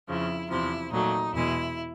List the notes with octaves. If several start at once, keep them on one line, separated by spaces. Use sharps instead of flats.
F2 C#3 F3 E4
E2 C3 F3 E4
A#2 F#3 A3 D#4
E2 B2 G#3 E4